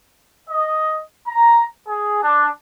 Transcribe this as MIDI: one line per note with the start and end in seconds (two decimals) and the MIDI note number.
0.49 0.98 75
1.28 1.65 82
1.88 2.22 68
2.22 2.49 62